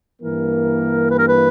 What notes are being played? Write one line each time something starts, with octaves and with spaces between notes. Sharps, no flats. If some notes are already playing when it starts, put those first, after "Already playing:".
G2 E3 A#3 A#4
B4
A#4
B4